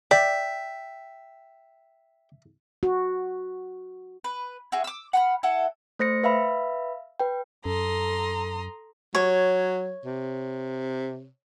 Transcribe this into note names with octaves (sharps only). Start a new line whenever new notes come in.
D5 E5 G5
F#4
B4
E4 F#4 G#4
D6 E6
F#5 B5 F6
E4 A4 F#5
A3 C5 A#6 C#7
B4 E5 F5 B5
B4 G5
F#2 A4 A#5 C6 D#6
F#3 C#5
C3